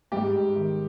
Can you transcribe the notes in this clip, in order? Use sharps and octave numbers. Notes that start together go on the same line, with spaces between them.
G#2 G3 G4
G#2
D#3